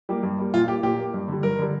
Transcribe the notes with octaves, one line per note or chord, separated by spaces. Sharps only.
G3 A#3 G4
G2
G3 A#3
A#2 F4
A#3 G4
A#2 G4
A#3
G2
D3 G3
G2 A#4
D3 G3